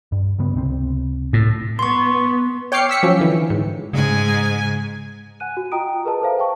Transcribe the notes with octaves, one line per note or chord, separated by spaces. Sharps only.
G2
G2 C#3 B3
C#2 C3 C4
A2
B3 C6 C#6
C#5 G5 D6 F6 C7 C#7
E6 B6 C#7
F3 F#3 C#4
D3 E3
G#2
G#2 C#3 G#5
F#5 G#5 F#6 D#7
F#4
F4 D#5 G5 A#5 D#6 D7
G#4 A#4 B4 D#5 A5
A4 B4 C5 E5 F5 A#5
G5 A5 C#6